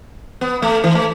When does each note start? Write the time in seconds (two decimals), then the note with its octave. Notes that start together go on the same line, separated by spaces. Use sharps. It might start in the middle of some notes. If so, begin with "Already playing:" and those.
0.41 B3
0.62 A3
0.84 E3
0.95 A3